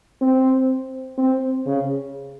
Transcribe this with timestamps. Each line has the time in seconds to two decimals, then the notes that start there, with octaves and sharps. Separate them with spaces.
0.21 C4
1.18 C4
1.66 C#3